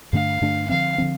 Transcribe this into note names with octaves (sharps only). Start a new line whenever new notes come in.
G2 D3 A3 D4 F5
G2 D3 A3 D4
D3 F3 C4 F5
D3 F3 C4